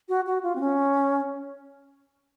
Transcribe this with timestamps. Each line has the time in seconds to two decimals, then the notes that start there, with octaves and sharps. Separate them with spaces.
0.09 F#4
0.26 F#4
0.43 F4
0.56 C4
0.60 C#4